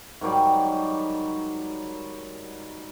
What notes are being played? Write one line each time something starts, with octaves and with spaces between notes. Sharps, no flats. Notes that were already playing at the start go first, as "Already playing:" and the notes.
G#2 D#3 F#3 G3